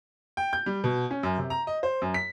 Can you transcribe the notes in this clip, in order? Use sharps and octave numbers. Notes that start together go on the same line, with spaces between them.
G5
G6
G3
B2
C#4
F#2
C3
A#5
D#5
C5
F#2
B6